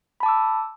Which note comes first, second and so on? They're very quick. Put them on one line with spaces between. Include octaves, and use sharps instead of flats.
B5 A5 D6 E6